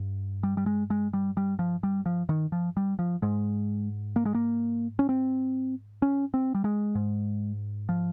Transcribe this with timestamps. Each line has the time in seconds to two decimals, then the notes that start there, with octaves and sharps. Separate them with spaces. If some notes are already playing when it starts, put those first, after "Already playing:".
Already playing: G2
0.43 G3
0.57 G3
0.66 G#3
0.90 G#3
1.13 G3
1.37 G3
1.59 F3
1.83 G3
2.06 F3
2.29 D#3
2.52 F3
2.77 G3
2.99 F3
3.22 G#2 G#3
4.16 A#3
4.25 G#3
4.34 A#3
4.99 C#4
5.09 C4
6.02 C#4
6.34 C4
6.55 G3
6.64 G#3
6.95 G#2
7.89 F3